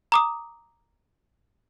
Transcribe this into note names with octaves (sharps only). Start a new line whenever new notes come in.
A#5 D6 D#6